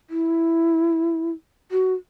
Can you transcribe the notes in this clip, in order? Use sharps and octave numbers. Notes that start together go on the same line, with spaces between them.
E4
F#4